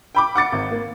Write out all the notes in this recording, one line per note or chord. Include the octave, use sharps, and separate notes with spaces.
G5 B5 D6
F#5 D6 A6 C#7
G#1
A#3